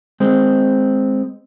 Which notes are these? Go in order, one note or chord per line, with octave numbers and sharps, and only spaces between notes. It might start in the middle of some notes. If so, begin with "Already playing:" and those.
G#3 C4